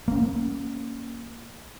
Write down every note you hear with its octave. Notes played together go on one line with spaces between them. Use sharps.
A#3 C#4